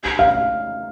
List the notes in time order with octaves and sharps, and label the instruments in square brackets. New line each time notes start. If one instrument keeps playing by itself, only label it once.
[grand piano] F5